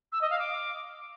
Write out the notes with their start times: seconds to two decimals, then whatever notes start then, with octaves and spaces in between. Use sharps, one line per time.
0.12 E6
0.21 D#5
0.30 F5
0.39 D6